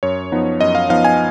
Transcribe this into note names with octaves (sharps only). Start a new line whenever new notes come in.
F#2 C#5
F3 B3 D#4
F#2 D#5
F5
F3 B3 D#4 F5
G#5